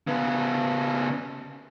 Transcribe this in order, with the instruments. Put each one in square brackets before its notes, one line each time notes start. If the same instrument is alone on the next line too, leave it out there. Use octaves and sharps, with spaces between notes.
[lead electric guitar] C#3 B3